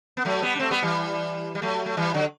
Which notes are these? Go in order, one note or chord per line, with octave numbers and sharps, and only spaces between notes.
B3
F#3 A3
G3 B3
D4
A3 C4
G3 B3
E3 G3
G3
F#3 A3
A3
E3 G3
D3 F#3